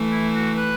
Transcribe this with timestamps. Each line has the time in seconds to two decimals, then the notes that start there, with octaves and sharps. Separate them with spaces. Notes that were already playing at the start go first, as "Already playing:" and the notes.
Already playing: E3 A3
0.11 E4
0.34 F#4
0.57 B4